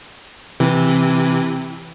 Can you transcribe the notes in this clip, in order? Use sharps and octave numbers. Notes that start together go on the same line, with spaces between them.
C3 E3